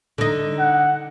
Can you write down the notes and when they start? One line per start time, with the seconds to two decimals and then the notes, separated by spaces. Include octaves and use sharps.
0.18 D3 D#4
0.59 F#5